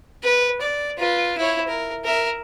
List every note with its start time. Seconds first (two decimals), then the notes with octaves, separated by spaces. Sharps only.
0.23 B4
0.61 D5
0.98 F4 B4
1.38 E4 C#5
1.68 A#4
2.05 A#4 E5